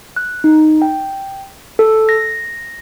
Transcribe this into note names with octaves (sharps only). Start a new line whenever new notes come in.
F#6
D#4
G5
A4
A#6